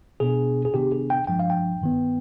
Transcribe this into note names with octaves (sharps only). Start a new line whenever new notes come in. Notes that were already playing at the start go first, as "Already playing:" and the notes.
B2 B3 D4 G#4
G#4
C3 D#3 B3 D4 G4
G#4
G5
G2 F3 G#3 D4 G5
F5
G5
G2 D#3 B3